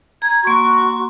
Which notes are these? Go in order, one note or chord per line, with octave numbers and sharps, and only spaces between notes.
A#5 G#6
A#3 F#4 C6 C#6